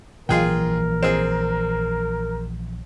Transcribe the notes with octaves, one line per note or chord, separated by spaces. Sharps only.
A#1 E3 F#3 F4 G#4 A#4 G5
C4 G#4